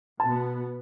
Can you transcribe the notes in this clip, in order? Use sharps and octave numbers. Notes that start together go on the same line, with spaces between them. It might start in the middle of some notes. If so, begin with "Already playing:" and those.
B2 B3 A5